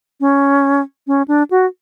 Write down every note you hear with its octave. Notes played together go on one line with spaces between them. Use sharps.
C#4
C#4
D4
F#4